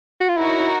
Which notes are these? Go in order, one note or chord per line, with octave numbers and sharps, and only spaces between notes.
F#4
F4
D#4 E4 F#4 A#4 C#5 F#5
E4